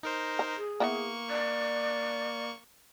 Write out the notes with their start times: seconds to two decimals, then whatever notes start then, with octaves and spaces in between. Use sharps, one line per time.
0.03 D#4 A#4 C5
0.39 A#5
0.57 G#4
0.80 A#3 B3 E4 A#5 C#6
1.30 D5